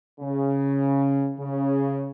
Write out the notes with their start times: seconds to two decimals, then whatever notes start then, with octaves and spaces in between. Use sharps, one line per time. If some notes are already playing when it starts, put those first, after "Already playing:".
0.21 C#3
1.38 C#3